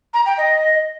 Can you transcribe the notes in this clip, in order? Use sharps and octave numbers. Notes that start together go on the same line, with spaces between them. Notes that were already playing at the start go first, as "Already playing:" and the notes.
A#5
G5
D#5